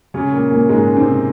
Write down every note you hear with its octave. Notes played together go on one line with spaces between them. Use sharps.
C#3 C#4
A#2 A#3
A#2 A#3
G#2 G#3
C3 C4